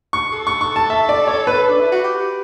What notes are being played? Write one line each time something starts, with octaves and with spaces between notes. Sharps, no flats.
C#6
A4
C#6
C#6
A5
E5
D5
C#5
B4
D4
E4
F#4
G4